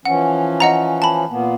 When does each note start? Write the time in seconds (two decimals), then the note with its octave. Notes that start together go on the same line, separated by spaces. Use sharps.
0.05 E3 F3 C#4 F#5
0.60 D#5 F#5 A#5
1.02 A5 B5
1.30 A#2 A#3 B3